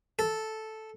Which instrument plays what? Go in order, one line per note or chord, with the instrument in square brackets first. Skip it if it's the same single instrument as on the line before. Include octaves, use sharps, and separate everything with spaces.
[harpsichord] A4